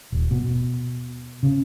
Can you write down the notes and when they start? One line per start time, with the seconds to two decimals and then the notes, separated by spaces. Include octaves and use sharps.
0.12 D#1
0.31 B2
1.43 C#3